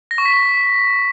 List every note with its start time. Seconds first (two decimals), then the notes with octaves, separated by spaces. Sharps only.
0.11 A#6
0.18 C#6
0.25 B6
0.33 C#6